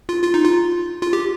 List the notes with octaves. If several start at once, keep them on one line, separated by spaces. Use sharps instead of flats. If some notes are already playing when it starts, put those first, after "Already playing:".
F4
F4
D#4
F4
F4
G4